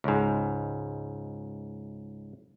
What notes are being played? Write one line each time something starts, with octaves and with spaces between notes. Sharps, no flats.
C#2 G#2